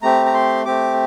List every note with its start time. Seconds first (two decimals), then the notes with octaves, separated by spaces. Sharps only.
0.02 A3 C4 G4 A#5
0.26 A#5
0.34 C6
0.65 A3 C4 G4 D6